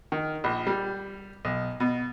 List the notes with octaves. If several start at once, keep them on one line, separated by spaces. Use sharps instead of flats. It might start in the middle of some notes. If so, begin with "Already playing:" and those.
D#3
A#1
G3
B1
B2